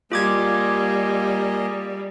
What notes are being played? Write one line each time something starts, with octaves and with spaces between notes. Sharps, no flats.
G3 A#3 F4 G#4 D#5 D6 G#6